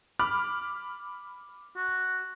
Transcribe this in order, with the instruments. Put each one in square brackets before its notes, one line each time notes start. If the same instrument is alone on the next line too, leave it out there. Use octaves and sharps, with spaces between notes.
[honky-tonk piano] B5 D6 F6
[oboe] F#4